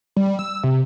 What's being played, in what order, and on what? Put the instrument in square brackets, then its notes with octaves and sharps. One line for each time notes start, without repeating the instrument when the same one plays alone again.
[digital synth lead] G3
E6
C3